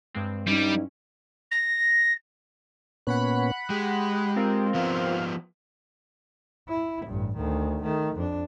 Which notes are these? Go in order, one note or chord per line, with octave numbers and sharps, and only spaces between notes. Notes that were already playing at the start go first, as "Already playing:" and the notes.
G2 G#3 C4
G2 G3 C#4 D#4 E4
A#6
A#2 B3 C#4 F#5 B5 F#6
G#3 G4
C4 F4 A#4
F3 B3 F5
E4
A1 G2
D2 D#3
D#3 A3
F2 D4